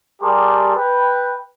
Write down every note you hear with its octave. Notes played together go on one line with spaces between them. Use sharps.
G3 G4 G#4 A#4 A5 C6
B4 G5